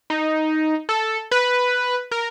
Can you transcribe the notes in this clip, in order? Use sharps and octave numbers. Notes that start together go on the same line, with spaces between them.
D#4
A4
B4
A#4